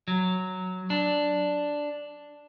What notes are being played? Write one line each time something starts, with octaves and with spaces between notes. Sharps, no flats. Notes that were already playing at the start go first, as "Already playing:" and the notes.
F#3
D4